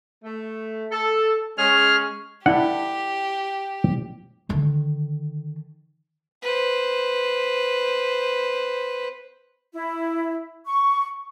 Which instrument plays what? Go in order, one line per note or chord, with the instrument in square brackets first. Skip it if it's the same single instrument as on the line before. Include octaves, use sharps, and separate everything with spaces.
[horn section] A3
A4
[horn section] G#3 C#4 [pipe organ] G#4 F6
[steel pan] D4 E4 [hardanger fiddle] G4 [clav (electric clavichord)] F#5
[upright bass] D3 D#3
[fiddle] B4 C5
[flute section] E4
C#6